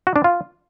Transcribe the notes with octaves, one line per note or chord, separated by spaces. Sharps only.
F#4
D4
F4